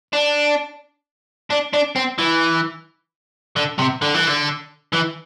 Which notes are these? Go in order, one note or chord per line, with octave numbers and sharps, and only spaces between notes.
D4
D4
D4
C4
E3
D3
C3
D3
E3
D3
E3